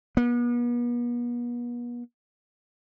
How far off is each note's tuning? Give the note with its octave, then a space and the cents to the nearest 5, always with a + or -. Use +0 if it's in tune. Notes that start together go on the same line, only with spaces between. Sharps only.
B3 -40